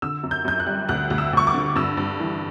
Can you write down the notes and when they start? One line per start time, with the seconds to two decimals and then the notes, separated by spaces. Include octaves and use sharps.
0.02 D3 E6
0.23 F#2
0.31 G6
0.45 F#2 G6
0.60 F#6
0.66 G3
0.89 D2 F#6
1.10 D2
1.18 E6
1.33 D2 C#6
1.47 D6
1.54 D3
1.76 G2 E6
1.97 G2
2.19 E3